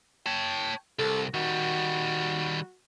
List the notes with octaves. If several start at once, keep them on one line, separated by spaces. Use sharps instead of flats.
C#5 G5 A5
C2 A4
D#3 G3 F#4